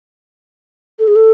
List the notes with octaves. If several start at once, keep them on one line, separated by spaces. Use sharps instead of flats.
A4
G#4
A4